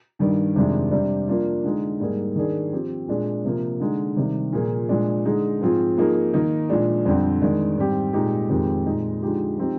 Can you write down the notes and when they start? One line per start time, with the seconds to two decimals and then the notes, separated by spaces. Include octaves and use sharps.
0.19 G2 D#3 G3
0.56 F2 C3 D#3 G#3 D4
0.91 C3 G3 D4
1.27 F3 A#3 D4 F4
1.63 D3 G#3 D#4
2.00 G#2 G3 A#3 D#4 G#4
2.36 D#3 A#3 D4 G#4
2.72 F3 C4 G4
3.08 A#2 G#3 D4 G#4
3.45 C3 F3 A#3
3.80 D3 G#3 D#4
4.17 C3 D#3 G3
4.53 A#2 F3 A#3 F4 G#4
4.89 A#2 F3 G#3 D4
5.25 D3 G#3 D#4 G#4
5.61 G#2 F3 C4 F4 G#4
5.97 F3 A#3 D#4 G#4
6.34 D#3 A#3 D#4
6.69 A#2 F3 G#3 D4 G#4
7.06 F2 D3 G3 C4
7.42 D#3 G#3 D4
7.77 G#2 G3 C4 G4
8.13 A#2 G#3 D#4 G4
8.49 F2 D#3 G#3 C4 G4
8.86 A#2 G#3 D#4
9.22 D3 F3 G#3 D#4 G4
9.58 F3 C4 D#4 G4